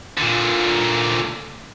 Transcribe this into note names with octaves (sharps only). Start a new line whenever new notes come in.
A#2 D3